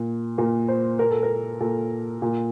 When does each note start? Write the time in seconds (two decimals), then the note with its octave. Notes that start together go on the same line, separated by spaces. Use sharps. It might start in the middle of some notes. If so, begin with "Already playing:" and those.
Already playing: A#2
0.38 A#2 A#4
0.68 C5
0.99 A#2 A#4
1.11 A4
1.23 A#4
1.60 A#2 A4
2.22 A#2